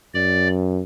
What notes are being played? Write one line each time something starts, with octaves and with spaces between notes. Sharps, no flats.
F#2 D5